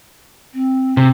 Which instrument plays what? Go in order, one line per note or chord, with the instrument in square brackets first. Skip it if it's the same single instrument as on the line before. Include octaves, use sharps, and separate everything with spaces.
[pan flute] C4
[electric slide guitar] C3